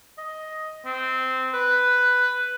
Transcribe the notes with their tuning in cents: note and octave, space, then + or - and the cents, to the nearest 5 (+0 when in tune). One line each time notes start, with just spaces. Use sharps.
D#5 +10
C4 -15
B4 +5